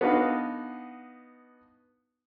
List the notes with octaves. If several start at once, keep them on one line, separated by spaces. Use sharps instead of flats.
B3 D4 D#4 F#4 B4 F5